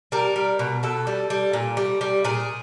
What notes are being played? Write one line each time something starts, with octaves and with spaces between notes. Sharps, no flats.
G3 A#4
G3
B2
B2 A4
G3
G3
A#2
G3
G3
A#2 G#4